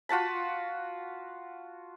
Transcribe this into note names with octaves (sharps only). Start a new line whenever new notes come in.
F4 F#4 A5 B5